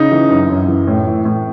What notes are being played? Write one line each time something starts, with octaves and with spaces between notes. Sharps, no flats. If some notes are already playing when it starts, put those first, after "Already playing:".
Already playing: C#3 D#4
E3
F#2
F#2
E3
A2
E3
A2